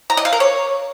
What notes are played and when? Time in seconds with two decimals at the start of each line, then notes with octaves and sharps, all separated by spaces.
0.10 A#5
0.17 D#5
0.25 F5
0.33 A#4
0.40 C#5